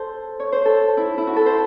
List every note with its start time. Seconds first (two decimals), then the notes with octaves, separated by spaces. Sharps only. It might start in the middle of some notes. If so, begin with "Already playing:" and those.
Already playing: A4 C5
0.40 C#5
0.52 C5
0.65 A4
0.97 E4
1.18 E4
1.27 F#4
1.36 A4
1.46 C5